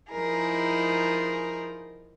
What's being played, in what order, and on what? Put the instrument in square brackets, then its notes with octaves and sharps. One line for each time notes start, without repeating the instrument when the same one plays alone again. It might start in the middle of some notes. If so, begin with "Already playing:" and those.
[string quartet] F3 D#4 E4 G#4 A#4